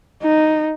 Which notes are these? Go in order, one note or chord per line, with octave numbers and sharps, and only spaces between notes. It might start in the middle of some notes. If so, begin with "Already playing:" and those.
D#4